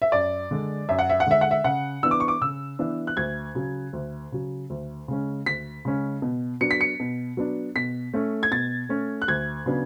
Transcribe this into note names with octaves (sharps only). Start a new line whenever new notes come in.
E5
F#2 D5
D3 G#3
F#2 E5
F#5
E5
F#5
D3 G#3 E5
F#5
E5
C#3 F#5
E3 B3 D4 E6
D6
C#6
D6
C#3 E6
E3 B3 D4
F#6
D2 G#6
C#3 F#3
D2
C#3 F#3
D2
C#3 G#3 C#4
D2 B6
C#3 G#3 C#4
B2
F#3 B3 D4 C#7
B6
C#7
B2
F#3 B3 D4
B2 B6
A3 C#4
G#6
B2 A6
A3 C#4
F#6
D2 G#6
C#3 F#3 B3 D4